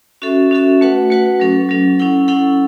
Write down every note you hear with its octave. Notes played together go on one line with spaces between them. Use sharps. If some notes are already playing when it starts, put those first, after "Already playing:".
C#4 F#4 A4 E5
C#4 F#4 A4 E5
A3 F#4 B4 F#5
A3 F#4 B4 F#5
F#3 C#4 A4
F#3 C#4 A4
C#4 E4 A4 F#5
C#4 E4 A4 F#5